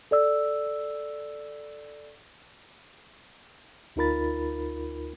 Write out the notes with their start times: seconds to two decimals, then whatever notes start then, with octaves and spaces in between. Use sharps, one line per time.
0.11 A4 D5 E6
3.96 D2 D#4 F4 A#4 B5 A6